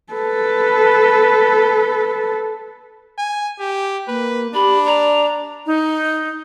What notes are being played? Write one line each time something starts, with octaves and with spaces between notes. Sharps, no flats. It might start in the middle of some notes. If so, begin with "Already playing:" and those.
A4 B4
G#5
G4
A#3 B4
D4 G4 B5
D5 A#5
D#4